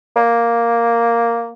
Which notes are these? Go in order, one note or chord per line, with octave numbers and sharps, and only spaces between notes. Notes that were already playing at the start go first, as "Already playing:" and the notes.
A#3